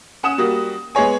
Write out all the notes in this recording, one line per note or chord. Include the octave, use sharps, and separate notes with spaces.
C#4 F#5 D#6 E7
G3 A#3 F#4
G#3 B3 G#4 C#5 G#5